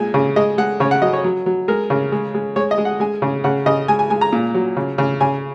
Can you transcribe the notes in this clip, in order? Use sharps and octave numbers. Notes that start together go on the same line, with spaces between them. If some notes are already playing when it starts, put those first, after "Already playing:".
Already playing: A#2 G#3 G#5
C#3
G#3 D#5
G#3 F#5
C#3 C#5
F#5
F#3 D#5
C#5
F#3
F#3
G#3 A#4
C#3
G#3
G#3
G#3 C#5
D#5
G#3
F#5
G#3 G#5
C#3
C#3 F#5
C#3 D#5
G#3 G#5
G#5
G#3 G#5
A#5
A#2
F#3
C#3
C#3
C#3 G#5